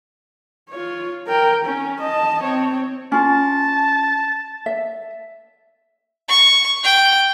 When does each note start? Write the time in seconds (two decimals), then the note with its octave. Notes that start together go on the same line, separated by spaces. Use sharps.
0.69 F4 C#5
1.28 A#4 G5
1.65 C#4
2.01 D#5 A5
2.42 C4 C#5
3.12 C#4 F4 A5
4.66 E5
6.28 C#6
6.84 G5